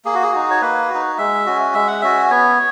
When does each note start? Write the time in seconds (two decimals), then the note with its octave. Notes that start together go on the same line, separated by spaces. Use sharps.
0.05 A#3 G#4
0.15 F#4
0.23 G#4
0.33 D#4 F#4
0.51 C#5
0.62 A#3 B4
0.89 D#4 F#4
1.18 G#3 E5
1.46 C#4 F#4
1.74 G#3 E5
1.88 F#5
2.01 C#4 F#4 E5
2.30 B3 C#5